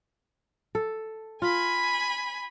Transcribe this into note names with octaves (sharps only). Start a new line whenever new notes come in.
A4
F4 G#5 B5